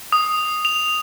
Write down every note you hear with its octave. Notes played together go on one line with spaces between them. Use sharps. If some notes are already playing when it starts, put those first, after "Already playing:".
D#6
F7